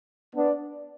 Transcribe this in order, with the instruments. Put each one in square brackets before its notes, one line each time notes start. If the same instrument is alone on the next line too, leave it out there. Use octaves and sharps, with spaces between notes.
[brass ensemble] B3 D4